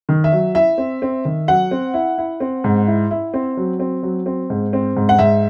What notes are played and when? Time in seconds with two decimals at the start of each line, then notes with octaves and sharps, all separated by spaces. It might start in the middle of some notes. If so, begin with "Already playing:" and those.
0.09 D#3
0.24 E5
0.32 F#3
0.55 E4 E5
0.78 C4
1.02 C4
1.25 D#3
1.48 F#3 F#5
1.71 C4
1.94 E4
2.18 E4
2.40 C4
2.64 G#2
2.87 E4
3.11 E4
3.34 C4
3.57 F#3
3.80 C4
4.03 F#3
4.26 C4
4.50 G#2
4.73 C4
4.96 G#2
5.09 F#5
5.19 G#2 E5